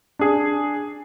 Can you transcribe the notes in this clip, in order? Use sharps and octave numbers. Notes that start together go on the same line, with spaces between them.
D4 G#4